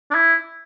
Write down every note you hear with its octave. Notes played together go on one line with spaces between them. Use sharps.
D4
E4